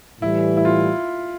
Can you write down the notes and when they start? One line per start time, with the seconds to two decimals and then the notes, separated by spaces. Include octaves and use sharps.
0.21 A2 E3 G3 E4
0.57 E4
0.65 F4